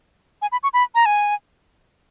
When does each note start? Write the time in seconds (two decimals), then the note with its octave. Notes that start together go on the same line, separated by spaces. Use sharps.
0.42 G#5
0.52 B5
0.63 C#6
0.74 B5
0.95 A#5
1.06 G#5